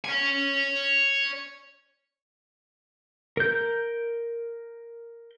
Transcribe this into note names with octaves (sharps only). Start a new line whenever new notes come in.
C#5 G#5
A#4 G6